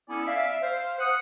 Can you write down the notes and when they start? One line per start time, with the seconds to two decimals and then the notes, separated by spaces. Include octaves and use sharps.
0.09 B3 C#4 E4 A4 D5 G#5
0.26 D5 E5 F5
0.61 C5 F5
0.99 F#5 D#6